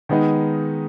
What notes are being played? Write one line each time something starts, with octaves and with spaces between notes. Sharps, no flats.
D#3 G#3 B3 D#4